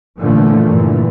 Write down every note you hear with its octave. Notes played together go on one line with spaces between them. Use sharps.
A#2 D3 E3 F3 A3
G2 A#2 D3 E3